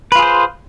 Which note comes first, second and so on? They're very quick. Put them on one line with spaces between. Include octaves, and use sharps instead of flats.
B4 F4 G#4 C5